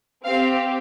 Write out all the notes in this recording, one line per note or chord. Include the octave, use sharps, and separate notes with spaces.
C4 G4 F5